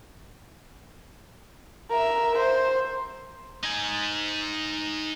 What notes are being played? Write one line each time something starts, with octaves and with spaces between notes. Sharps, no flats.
A#4 E5
C5
D#4 G#5